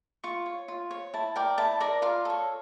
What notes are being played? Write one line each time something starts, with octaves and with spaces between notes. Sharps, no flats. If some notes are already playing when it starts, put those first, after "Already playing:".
F4 C#6
C#5
F4
C#5
E4 A5
A#4 D5 G5
E4 A5
A#4 D5 A#5
F4 F5
A4 C#5